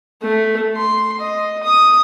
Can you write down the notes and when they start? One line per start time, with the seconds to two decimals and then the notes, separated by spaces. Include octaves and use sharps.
0.22 A3
0.76 C6
1.20 D#5
1.63 D#6